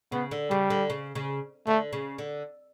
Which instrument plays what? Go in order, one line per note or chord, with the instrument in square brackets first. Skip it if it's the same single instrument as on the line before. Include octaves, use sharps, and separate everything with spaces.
[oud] C#3 [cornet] B3
[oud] D3
[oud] C#3 [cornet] G3
[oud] D3
C#3
C#3
[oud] D3 [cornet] A3
[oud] C#3
D3